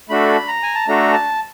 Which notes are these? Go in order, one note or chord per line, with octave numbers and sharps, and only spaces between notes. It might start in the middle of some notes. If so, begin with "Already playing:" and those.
A3 D4 F#4 A4 B5
A#5
G#5
A5
A3 D4 F#4 A4 A#5
A5